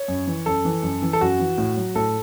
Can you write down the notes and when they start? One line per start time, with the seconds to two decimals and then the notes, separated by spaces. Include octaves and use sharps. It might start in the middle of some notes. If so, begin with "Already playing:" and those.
Already playing: C#5
0.08 F#2
0.28 E3
0.46 F#2 A4
0.65 E3
0.83 F#2
1.02 E3
1.13 A4
1.21 F#2 F#4
1.39 E3
1.58 A2
1.77 F#3
1.95 A2 A4